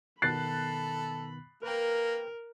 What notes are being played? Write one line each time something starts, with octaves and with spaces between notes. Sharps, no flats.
B2 D#3 B3 A4 B5 F#6 A6 C7
A#3 A#4 B4 G5